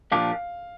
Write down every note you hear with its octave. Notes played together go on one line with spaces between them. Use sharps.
A#2 F3 D4 G4 F5